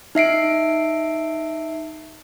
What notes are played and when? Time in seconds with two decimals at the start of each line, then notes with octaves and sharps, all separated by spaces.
0.15 D#4 E5 C7 D7